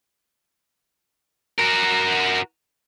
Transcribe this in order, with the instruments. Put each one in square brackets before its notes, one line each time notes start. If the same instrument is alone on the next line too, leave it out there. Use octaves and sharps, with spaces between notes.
[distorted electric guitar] F#4 A#4